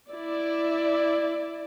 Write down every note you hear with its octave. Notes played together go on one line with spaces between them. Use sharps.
E4 D5